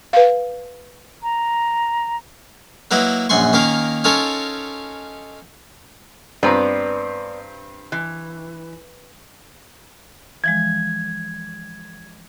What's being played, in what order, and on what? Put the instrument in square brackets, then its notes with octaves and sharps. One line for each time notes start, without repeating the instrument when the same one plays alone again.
[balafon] B4 F5
[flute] A#5
[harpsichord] F#3 A#3 E4 B4 D#5
A#1 F#2 F#5 G#5 C6 C#6
D#3 A#3 C#4 A#4 F5
C#4 D#4 F4 A4 A#4 C#5
[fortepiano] G2 C4 A#5 [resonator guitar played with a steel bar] B3 B4 D5
[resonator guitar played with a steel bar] E3
[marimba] E3 F3 G#3 [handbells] G#6